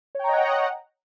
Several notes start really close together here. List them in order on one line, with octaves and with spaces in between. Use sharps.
C#5 G5 A#5 D#5 F#5